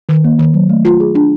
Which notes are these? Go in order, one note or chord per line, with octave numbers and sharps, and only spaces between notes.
D#3
A#3
D#3
F#3
A3
F4
G#4
D4